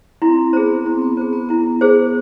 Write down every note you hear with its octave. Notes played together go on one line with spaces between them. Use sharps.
C4 E4
B3 G#4 C5
C4 E4
B3
B3 G#4 C5
B3
B3 E4
G#4 C5